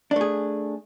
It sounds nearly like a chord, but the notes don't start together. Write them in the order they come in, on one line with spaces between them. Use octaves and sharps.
D4 A3 G#4